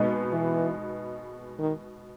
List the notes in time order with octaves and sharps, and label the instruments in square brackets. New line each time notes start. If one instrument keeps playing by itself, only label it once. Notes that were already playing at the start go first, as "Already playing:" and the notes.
Already playing: [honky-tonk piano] B2 G#3 B3 D#4
[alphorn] E3
D#3